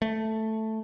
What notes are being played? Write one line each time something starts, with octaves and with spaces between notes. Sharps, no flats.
A3